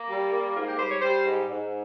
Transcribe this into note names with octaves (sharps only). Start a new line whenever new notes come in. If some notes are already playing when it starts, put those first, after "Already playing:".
Already playing: A#3
G3
A#3
G#2 F4
G4
G3 C5
C#5
G3 C5
G#2
G#2